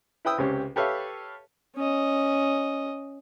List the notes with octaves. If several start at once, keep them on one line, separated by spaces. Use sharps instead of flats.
E4 B4 G5 D#6 E6
C#2 C3 C#4 G4
G4 A4 B4 C#5 E5 F5
C#4 D#5